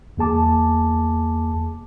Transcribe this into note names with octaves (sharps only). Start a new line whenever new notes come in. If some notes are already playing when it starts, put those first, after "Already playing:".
E2 A#3 G#4 A5 D6